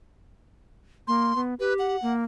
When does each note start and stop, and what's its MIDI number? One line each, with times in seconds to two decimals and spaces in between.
1.08 1.35 58
1.08 1.40 84
1.36 1.54 59
1.60 1.96 67
1.60 1.74 71
1.79 2.13 78
2.02 2.24 58